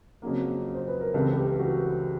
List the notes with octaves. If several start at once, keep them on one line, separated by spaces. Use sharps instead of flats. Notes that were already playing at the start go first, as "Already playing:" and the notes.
F2 C#3 F#3 A#3
C5
B4
A#4
C#2 C#3 E3 G3 C4 A4
G4
F#4